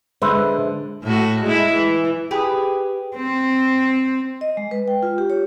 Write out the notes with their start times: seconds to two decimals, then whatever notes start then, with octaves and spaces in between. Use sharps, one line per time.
0.22 D3 G#3 B4 C5 E5
1.04 A2 F#4
1.43 G#3 E4
1.75 E3
2.31 G4 G#4 B4
3.16 C4
4.41 D#5
4.57 G#3
4.71 B4
4.88 G5
5.03 F4
5.18 G4
5.30 C#5